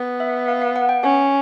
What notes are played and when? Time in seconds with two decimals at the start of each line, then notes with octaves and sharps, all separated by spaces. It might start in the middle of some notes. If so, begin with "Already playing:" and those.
Already playing: B3
0.20 E5
0.48 F5
0.62 F5
0.76 F#5
0.89 G5
1.03 C#4